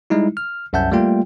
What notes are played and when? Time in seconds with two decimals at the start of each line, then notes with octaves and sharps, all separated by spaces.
0.10 G3 G#3 D#4 E4
0.37 F6
0.73 C2 F#2 E5 F#5 A5 G6
0.91 G3 A3 A#3 F4 G5